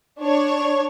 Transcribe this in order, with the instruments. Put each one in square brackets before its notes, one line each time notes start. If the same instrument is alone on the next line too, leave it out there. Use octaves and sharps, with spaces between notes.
[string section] D4 C#5